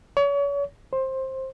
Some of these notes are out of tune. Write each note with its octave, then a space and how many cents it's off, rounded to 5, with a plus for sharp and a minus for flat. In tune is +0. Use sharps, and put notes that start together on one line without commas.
C#5 +35
C5 +15